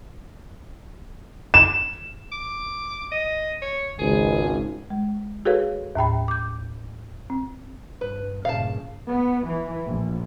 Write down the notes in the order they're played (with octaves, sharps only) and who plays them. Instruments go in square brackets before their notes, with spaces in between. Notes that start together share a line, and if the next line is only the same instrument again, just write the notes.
[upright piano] E7
[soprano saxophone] D6
D#5
C#5
[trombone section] G#1 C#2 [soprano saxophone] G#4
[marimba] G#3
F#4 G#4 A4 B4 C#5 F5
D#2 A2 G5 B5
D6 G6
C4
[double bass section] G2 [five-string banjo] B4
[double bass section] G2 A#2 C#3 [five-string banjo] F5 A5
[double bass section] B3
E3
A#1